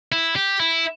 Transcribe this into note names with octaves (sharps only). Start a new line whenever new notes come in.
E4
G4
E4